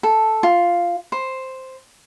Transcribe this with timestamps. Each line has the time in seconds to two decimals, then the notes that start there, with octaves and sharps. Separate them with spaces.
0.03 A4
0.43 F4
1.12 C5